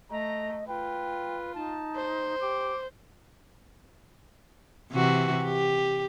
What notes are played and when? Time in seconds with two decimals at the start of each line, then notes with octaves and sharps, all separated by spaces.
0.11 A3 D#5 A#5
0.68 F4 B4 G5
1.55 D#4 A5
1.96 C5
2.41 G4 D6
4.92 C3 E3 F#4
5.44 G4